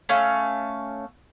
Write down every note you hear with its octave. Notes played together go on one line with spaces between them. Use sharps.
A3 C#4 F5 C#6